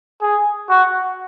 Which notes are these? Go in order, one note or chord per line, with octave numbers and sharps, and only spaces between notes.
G#4
F#4